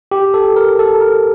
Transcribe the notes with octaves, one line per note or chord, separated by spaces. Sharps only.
G4
A4
A#4
A4
A#4